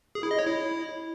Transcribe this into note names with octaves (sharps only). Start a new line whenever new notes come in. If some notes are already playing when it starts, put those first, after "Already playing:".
G#4
E4
D#5
C#5
E4